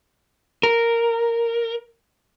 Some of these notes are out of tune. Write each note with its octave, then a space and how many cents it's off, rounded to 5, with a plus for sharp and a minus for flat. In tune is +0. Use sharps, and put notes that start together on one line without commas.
A#4 -5